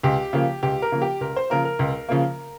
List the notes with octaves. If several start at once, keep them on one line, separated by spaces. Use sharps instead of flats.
C#2 G4
C#3 F3 A#3
C#2 G4
A#4
C#3 F3 A#3
G4
C#2 A#4
C5
C#3 F3 A#3 A#4
A#4
C#2
C#3 F3 A#3